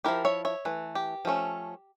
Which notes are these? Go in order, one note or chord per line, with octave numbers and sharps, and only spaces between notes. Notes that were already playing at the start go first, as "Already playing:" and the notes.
F3 A3 E4 G4 A#4
C#5 E5
C#5 E5
E3 A3
G4
F3 A3 C#4